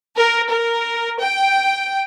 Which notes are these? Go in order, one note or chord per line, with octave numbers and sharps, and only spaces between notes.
A#4
A#4
G5